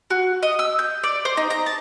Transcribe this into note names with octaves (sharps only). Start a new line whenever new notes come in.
F#4
D#5
E6
G6
D5
C5
D#4
A#5
A5